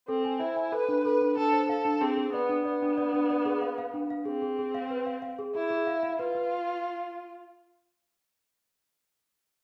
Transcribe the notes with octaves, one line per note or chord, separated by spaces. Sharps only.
C4 A4
G#5
E4 C5
G#5
A4 B4
D4
A4 B4
D4
D4 A4
C5
A4 F5
D4
C4 G#4
G#4
B3 D5
D4
B3 D5
D4
D5
D4
D5
G#4
F5
F5
D4
F5
C4 G#4
G#4
G#4
F5
B4
F5
F5
G#4
E4 G#4
G#4
F5
F5
F4 B4
B4